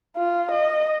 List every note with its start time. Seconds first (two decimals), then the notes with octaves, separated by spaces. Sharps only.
0.17 F4
0.51 D#5